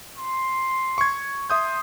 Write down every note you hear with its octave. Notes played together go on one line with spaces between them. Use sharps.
C6
C#6 G#6
E5 C6 D#6 G6